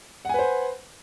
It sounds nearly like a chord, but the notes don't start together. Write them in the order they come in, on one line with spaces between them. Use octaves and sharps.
F#5 G#5 B4 C5